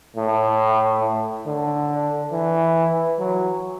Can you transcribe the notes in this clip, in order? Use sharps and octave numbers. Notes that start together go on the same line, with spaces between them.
A2
D3
E3
F#3